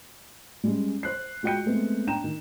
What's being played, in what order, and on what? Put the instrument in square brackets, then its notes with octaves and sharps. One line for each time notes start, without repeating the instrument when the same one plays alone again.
[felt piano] G3 G#3 C#4
C5 F#6 C7
G#3 F4 F#4 G5 G6 C#7
G#3 A3 B3 C4
D4 G5 A#5 E7
D#3